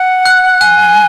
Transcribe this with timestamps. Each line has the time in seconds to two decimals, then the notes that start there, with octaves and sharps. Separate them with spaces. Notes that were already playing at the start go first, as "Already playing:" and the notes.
Already playing: F#5
0.26 F#6
0.61 G#5 F#6